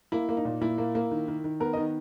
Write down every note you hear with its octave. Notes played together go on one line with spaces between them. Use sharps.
A#3 E4
A#3
D#4
A#2
A#2 E4
A#3
A#3
D#3
D#3
D#3
B3 A#4
D#3 D#5